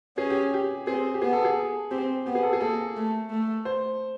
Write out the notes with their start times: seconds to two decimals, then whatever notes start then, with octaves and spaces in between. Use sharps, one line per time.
0.17 C#4 G#4
0.30 G4
0.54 G4
0.87 C4 G#4
1.14 G4
1.22 B3 G#4
1.33 A4
1.45 G#4
1.91 C4 G4
2.26 B3 G4
2.35 G#4
2.43 A4
2.53 G#4
2.61 A#3 A4
2.96 A3
3.30 A3
3.65 C5